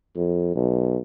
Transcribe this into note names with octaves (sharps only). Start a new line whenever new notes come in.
F2
B1